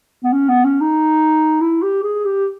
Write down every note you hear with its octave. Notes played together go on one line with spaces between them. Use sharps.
B3
C#4
B3
C#4
D#4
E4
G4
G#4
G4